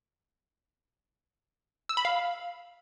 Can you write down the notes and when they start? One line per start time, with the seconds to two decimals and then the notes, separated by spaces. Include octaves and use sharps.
1.89 E6
1.97 B5
2.05 F5